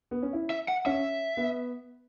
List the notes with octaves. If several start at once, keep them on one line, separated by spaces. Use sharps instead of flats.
B3
C#4
E4
E5
F#5
C#4 E5
B3